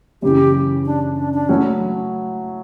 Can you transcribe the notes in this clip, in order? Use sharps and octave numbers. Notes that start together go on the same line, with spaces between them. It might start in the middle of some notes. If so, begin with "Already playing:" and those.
F#2 C#3 E3 G4
D4
D4
D4
F#3 A3 C#4 E4